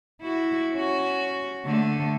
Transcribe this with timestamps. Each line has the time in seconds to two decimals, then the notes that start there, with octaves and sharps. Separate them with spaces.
0.21 E4 F#4
0.74 C#4 F#4
1.66 D3 A3